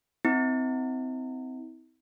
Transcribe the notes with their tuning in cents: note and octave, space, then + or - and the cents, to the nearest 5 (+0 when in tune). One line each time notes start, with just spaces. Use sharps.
C4 -25 E4 -45